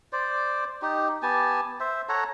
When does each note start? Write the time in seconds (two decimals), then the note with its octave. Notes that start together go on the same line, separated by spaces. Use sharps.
0.13 C5 D5
0.82 D#4 G4
1.23 B3 G4 G#5 A5
1.80 C5 E5
2.09 A4 C#5 F#5 A#5